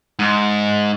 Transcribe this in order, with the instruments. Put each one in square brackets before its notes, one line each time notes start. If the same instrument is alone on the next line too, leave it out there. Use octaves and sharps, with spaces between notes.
[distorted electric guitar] G#2